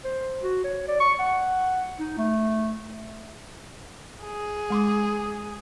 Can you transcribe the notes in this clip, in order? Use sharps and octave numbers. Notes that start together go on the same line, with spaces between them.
C5
F#4
C#5
D5
C#6
F#5
D#4
A3
G#4
G#3 C6 D6